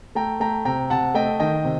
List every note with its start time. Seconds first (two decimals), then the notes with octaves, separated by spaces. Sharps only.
0.15 A3 G5 A#5
0.40 A3 G5 A#5
0.65 C3 G5 A#5
0.90 C3 F#5 A5
1.14 A3 D#5 G5
1.40 D#3 D#5 G5
1.64 C3